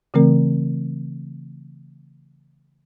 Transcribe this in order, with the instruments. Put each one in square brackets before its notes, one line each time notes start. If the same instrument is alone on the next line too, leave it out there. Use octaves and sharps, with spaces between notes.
[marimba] C#3 E3 A3 C4 A#4